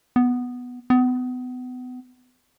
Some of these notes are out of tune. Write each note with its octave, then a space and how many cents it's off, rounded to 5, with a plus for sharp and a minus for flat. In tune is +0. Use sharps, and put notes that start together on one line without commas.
B3 +0
B3 +30